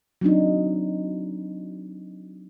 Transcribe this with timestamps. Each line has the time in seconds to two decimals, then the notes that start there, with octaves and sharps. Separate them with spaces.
0.21 F#3 C4 D4 D#4